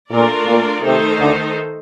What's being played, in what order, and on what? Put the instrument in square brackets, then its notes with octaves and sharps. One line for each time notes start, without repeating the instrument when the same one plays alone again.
[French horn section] A#2 [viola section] A3 D4 F4 A#4 D5
[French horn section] A#2
[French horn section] C3 [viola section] D#3 A3 D#4 A4 C5
[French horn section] D2 D3